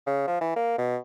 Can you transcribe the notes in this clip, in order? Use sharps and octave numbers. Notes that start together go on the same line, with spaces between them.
C#3
F3
E3
A#3
B2